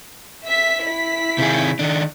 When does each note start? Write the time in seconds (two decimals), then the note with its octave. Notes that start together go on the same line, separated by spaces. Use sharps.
0.46 E5 B6
0.87 E4 B6
1.38 C3 D#3 G#4
1.79 D#3 D4